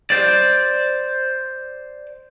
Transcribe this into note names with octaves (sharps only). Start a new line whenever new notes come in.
C5 D5